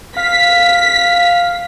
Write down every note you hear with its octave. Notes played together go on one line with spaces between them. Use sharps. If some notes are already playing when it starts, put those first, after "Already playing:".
F5 B6